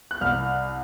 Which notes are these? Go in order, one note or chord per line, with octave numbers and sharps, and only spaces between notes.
F#6
C2 F6